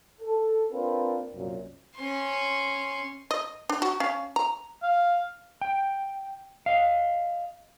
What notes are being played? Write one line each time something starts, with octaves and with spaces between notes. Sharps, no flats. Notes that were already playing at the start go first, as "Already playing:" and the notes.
A4
A#3 C4 D4 F4 A#4 B4
C2 F#2 A#2
C#4 C6
D#5
D4
F#4
C#4 F5
A#5
F5
G5
D#5 F5